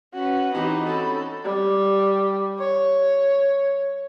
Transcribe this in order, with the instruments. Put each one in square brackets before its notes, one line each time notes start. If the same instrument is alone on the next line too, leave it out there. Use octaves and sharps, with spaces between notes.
[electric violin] C#4 B4 [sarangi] F#4
[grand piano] E3 F#4 G4 [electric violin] C4 [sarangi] D#4 [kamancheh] B5
[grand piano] C#4 [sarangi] A4
[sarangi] G3
C#5